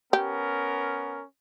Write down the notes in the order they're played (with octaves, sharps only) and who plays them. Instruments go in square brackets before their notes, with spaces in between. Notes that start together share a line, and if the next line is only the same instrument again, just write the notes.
[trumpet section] B3 C#4 A#4 [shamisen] G4